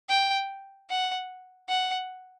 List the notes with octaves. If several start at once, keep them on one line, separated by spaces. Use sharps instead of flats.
G5
F#5
F#5